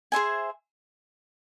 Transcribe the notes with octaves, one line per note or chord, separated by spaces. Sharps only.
G#4 C5 E5 G#5